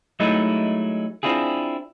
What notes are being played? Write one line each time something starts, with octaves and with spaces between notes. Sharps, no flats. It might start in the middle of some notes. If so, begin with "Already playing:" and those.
F#3 G#3 A3 D#4 E4
C4 D4 E4 F4 G#4